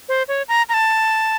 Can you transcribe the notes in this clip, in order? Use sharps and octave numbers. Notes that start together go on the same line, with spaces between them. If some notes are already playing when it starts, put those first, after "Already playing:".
C5
C#5
A#5
A#5
A5